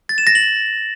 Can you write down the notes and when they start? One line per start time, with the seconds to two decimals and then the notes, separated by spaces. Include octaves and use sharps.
0.09 A6
0.18 E7
0.27 A#6
0.35 F#7